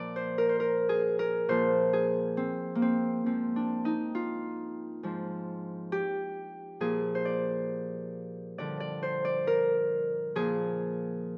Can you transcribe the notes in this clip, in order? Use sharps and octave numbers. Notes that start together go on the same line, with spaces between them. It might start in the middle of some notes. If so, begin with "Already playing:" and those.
Already playing: A#2 F3 D5
C5
A#4
C5
A#4
G#4
A#4
A#2 F3 C5
G#4
C4
A#3
C4
G#2 F3 C4
D4
D#4
F4
G#2 F3
G4
A#2 F3 G#4
C5
D5
G2 D3 F3 D5
D5
C5
D5
A#4
A#2 F3 G#4